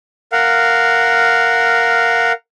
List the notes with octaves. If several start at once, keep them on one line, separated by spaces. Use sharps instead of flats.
A#4 F5 F#5